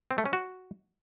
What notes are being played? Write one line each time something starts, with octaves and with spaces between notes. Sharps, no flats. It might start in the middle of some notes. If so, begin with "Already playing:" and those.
C4
A3
C#4
F#4